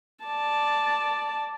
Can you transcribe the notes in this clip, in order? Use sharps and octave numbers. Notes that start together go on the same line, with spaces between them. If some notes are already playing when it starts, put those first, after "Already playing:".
D5 A5